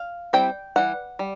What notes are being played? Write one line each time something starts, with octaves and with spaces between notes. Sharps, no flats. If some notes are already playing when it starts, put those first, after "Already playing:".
Already playing: F5
G3 C4 E4 G5
E3 G3 F#5
G3